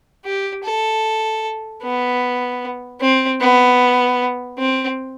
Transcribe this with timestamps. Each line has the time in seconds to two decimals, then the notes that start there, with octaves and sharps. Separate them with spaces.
0.25 G4
0.64 A4
1.83 B3
3.00 C4
3.40 B3
4.59 C4